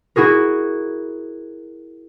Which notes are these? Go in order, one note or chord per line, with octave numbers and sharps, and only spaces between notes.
E4 F#4 G#4 A#4